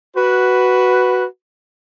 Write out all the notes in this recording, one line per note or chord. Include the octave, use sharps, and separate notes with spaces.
F#4 B4